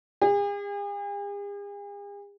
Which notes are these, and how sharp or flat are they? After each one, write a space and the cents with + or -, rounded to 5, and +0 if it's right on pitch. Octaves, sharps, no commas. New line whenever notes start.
G#4 -45